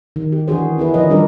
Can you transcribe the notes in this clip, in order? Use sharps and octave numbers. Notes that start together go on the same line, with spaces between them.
D#3
G4
E3 D4 F#4 G#4 C5
C#4 E4 G#4 B4
D#3 F3 A#4 D#5
G3 D4 A#4 D5